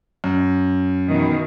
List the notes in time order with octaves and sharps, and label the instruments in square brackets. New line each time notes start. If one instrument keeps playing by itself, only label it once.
[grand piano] F#2
[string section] B2 D#3 E3